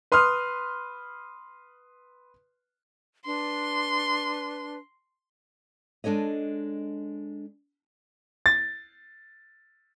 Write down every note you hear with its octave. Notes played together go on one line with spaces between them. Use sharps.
B4 C6 D#6 F6
D4 B4 C6
G#3 D4 A4 C#5 D#5
A6